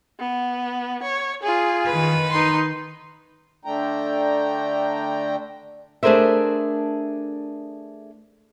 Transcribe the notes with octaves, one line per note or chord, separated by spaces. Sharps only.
B3
C#5
F4 G#4
D#3 B4
D#4 C6
D3 A3 D4 G5 A#5
A3 D4 G#4 A#4 C5 E5